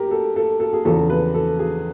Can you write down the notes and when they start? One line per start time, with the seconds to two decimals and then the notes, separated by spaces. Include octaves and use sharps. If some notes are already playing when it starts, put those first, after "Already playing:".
Already playing: G4 A#4
0.11 A4
0.36 A4
0.60 A4
0.73 G#4
0.85 E2 C#3 F3 A4
1.10 B4
1.34 A4
1.59 G#4